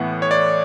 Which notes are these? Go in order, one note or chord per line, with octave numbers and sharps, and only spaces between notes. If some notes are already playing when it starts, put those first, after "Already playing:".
Already playing: A2 E3 B3 F#5
C#5
D5